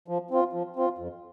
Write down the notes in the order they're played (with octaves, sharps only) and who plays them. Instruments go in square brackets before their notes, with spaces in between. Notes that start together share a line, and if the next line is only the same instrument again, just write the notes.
[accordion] F3
C4 F4
F3
C4 F4
F2